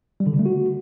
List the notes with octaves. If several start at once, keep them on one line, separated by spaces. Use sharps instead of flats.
G3
D3
C#3
A3
F#4